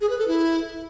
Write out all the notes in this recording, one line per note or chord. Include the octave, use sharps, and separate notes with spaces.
G#4
B4
A4
E4